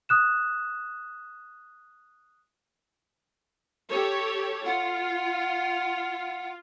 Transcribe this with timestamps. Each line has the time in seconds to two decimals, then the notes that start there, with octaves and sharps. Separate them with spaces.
0.09 D#6 F#6 E7
3.90 G4 A4 C#5
4.65 F4 F#5